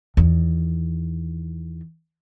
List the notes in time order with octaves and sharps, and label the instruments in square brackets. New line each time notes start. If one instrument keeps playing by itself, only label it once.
[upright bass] E2 D#3